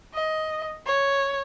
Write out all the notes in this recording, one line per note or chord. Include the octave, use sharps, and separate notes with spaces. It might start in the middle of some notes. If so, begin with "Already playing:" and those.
D#5
C#5